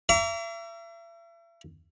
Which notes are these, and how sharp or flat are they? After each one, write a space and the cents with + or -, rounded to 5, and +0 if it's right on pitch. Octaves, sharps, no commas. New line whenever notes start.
E5 +40 A#5 +0 D6 -45